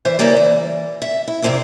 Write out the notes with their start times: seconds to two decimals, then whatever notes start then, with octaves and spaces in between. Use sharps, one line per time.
0.05 E3 C5 E5
0.19 D#2 C#3 E3 G3 A#3 D5
0.37 E3
1.02 E5
1.28 E4
1.42 F2 C3 A#3 C4 D4 E4